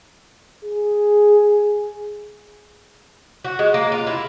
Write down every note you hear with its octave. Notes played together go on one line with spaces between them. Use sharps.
G#4
F#4
G#3
A#3
F4
E4